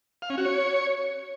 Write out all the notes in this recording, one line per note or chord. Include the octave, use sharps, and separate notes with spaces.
F5
C#4
F#4
C#5